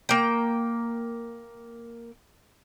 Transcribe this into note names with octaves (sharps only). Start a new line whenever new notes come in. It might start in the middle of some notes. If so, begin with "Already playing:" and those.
A#3 G5